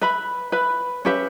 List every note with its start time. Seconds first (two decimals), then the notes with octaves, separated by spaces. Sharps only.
0.01 B4 E5 B5
0.52 B4 E5 B5
1.05 C#4 G4 B4 E5